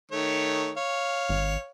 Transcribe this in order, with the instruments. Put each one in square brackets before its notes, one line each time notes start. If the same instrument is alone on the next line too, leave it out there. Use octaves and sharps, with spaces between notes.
[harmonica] D#3 A3 C#5
C#5 F5
[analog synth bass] G#1